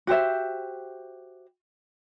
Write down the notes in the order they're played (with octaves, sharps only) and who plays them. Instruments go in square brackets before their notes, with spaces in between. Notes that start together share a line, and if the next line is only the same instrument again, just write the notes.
[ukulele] F#4 G4 C5 E5